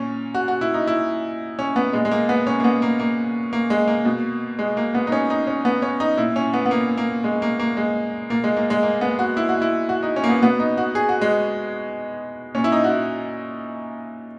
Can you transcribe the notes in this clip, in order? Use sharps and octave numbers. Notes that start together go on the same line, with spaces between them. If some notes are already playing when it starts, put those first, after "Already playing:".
Already playing: A#2 C#4
F#4
F#4
E4
D#4
E4
C#4
B3
A#2 G#3
G#3
A#3
B3
C#4
A#3
B3
A#3
A#3
A#3
G#3
A#3
B2
G#3
A#3
B3
D#4
C#4
D#4
C#4
B3
C#4
D#4
A#2 E4
C#4
B3
B3
A#3
A#3
G#3
A#3
A#3
G#3
A#2 A#3
G#3
A#3
G#3
A#3
B3
F#4
E4
F#4
E4
F#4
D#4
C#4
A#3
B3
B2 B3
D#4
F#4
G#4
F#4
G#3
A#2 C#4
E4
D#4
F#4
E4